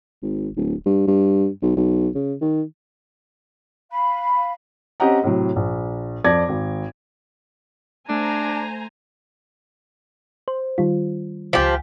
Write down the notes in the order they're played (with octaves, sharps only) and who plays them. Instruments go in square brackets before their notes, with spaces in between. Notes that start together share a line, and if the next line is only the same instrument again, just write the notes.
[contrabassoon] G#1
D1
G2
G2
B1
B1
C#3
D#3
[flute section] F5 B5
[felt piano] C4 C#4 G4 D#5 F#5 A#5
A2 C3 F#3
A#1
F2 D5 A5 D6 G#6 A#6
G#1
[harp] A3 [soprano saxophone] D4 [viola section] C5 G#5 A#5
[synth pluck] C5
D#3 G3 F4
[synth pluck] C#2 G#5 B6 [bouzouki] F3 G4